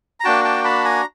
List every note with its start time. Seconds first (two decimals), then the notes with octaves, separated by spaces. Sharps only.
0.20 A#5
0.24 A#3 D4 F#4 G5 A5
0.44 G5 A5
0.64 A5 B5
0.85 G#5 A#5